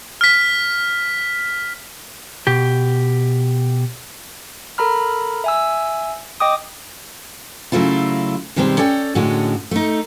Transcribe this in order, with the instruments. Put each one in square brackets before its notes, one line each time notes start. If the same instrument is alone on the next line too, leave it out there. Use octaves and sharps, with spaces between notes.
[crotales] F6 B6
[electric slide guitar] B2 G4
[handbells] A4 A#4 A#5 B5 F6
E5 G#5 E6
D#5 G5 D6 D#6
[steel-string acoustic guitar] C#3 F#3 A3 E4 F4
B2 D#3 G3 G#3 C4
C#4 A4 D5 G5
A2 D3 G#3 C#4 F#4
A3 D#4